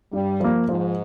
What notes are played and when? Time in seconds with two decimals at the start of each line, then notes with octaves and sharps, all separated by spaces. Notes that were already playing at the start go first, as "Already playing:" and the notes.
0.13 G2 G3
0.40 F3 A#3
0.68 G#2 F3